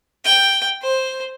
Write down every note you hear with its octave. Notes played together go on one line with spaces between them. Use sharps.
G5
C5